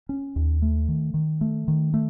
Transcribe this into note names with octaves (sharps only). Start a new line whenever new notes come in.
C#4
D#2
A3
D#3
D#3
A3
D#3
A3